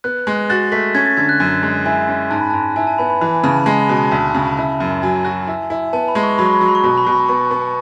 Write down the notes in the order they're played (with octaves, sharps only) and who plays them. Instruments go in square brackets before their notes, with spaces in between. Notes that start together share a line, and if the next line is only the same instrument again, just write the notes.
[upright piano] B3 [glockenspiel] F#6
[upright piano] G#3
[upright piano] F#4 [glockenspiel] A6
[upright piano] A3 [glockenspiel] B6
[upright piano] C#4 [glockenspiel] G#6
[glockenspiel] A6
[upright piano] D3 [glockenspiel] G#6
[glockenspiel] F#6
[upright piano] F#2
G#3
[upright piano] E4 [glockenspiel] G#5
[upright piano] C#4
[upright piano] G#2 [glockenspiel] A5
[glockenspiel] B5
[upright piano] G#2 [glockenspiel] A5
[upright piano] E4 [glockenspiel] G#5
[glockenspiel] A5
[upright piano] B3 [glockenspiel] B5
[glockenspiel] B5
[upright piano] E3 [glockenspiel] B5
[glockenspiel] B5
[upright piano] C#3 [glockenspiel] A5
[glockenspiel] A5
[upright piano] G#3 [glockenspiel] A5
[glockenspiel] B5
[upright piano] B2
[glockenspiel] A5
[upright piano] D2 [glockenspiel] A5
[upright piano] C#3
[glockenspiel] A5
[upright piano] E4 [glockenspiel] A5
[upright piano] F#2
[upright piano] F#3 [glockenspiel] G#5
[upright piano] F#4
E4
E4
[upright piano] B3 [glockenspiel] A5
[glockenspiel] B5
[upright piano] G#3
[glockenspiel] C#6
[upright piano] F#3 [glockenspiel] B5
[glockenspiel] C#6
B5
[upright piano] F#3 [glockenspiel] C#6
[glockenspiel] B5
C#6
[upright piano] B2 [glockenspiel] B5
[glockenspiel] C#6
B5
[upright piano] B2 [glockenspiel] C#6
[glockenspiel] B5
[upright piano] B3 [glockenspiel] C#6
[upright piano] B3